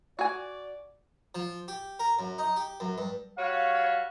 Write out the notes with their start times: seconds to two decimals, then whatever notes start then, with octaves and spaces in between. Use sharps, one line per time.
0.19 F#4 D5 G#5
1.35 F3
1.68 G4
1.99 A#4
2.19 F#2
2.39 D#4
2.56 G4
2.80 F#2
2.98 G2
3.38 G3 F#4 C#5 F5